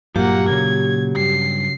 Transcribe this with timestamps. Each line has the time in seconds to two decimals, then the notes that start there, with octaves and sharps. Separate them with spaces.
0.16 G2 A#2 F#3 A#3 F4 G4 F#5
0.49 A#2 C#3 F#3 G#6
1.17 G2 C7